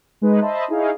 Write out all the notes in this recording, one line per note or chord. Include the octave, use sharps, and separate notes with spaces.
G#3 D#4 B4
C5 D#5 E5 A5 B5
D#4 E4 G#4 C#5 F5